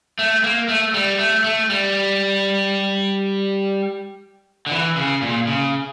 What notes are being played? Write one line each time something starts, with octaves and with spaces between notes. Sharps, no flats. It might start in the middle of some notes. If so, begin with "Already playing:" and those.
A3
A#3
A3
G3
A3
A3
G3
D3
E3
C#3
A#2
C#3